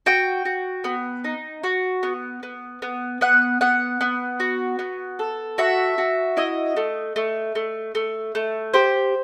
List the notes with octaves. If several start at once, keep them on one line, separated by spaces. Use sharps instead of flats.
F#4 G5
F#4
B3
D#4
F#4
B3
B3
B3
B3 F#5
B3 F#5
B3
F#4
B3
A4
F#4 E5
F#4
E4 D#5
A3
A3
A3
A3
A3
G4 C5